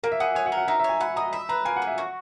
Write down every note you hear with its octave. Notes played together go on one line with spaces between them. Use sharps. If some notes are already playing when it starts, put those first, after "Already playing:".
A#3 A#4
E5
G#4 F#5
C#5 G#5
F#5
A#4
F#5
D#4 E5
E5
C#5
G#5
F#5 B5
D#5 A#5
E5 B5
B4 A#5
A#3 G#5
F#5
G#4
E5
F#4